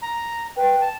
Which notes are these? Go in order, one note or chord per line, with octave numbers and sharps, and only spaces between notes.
A#5
B4 G5
A5